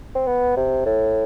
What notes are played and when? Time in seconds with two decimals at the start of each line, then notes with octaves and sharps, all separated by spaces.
0.15 C4
0.27 B3
0.57 C3
0.86 A2